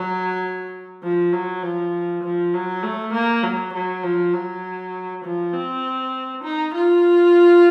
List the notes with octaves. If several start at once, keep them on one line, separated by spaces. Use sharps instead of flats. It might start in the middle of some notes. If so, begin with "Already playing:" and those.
Already playing: F#3
F3
F#3
F3
F3
F#3
A3
A#3
F#3
F#3
F3
F#3
F3
C4
D#4
F4